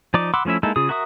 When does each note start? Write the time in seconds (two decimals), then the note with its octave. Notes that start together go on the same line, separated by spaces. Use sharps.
0.14 F3 D#4 D5 D6
0.34 F#5 B5 C6 D6 E6
0.45 F3 A3 C#4 E4 E5
0.63 G#3 A#3 D#4 E4 A4
0.76 C#3 F4 G#4 D#6
0.89 F#4 A#4 E5 C#6 D#6